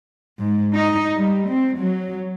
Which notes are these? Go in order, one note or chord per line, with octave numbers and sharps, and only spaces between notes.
G#2
D#4
G3
C4
F#3